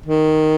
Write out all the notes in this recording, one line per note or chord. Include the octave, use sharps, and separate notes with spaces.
D#3